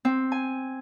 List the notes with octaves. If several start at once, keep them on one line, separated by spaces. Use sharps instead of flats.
C4
G#5